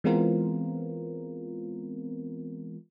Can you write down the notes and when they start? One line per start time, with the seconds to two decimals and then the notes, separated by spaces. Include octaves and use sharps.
0.04 E3 G#3 B3 C4 F4 A#4